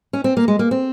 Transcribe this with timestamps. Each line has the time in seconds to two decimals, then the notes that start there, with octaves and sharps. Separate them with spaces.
0.13 C#4
0.24 C4
0.37 A#3
0.48 G#3
0.59 A#3
0.71 C4